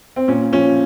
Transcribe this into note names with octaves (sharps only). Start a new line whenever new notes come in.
C4
A#2 C#4
F3 C#4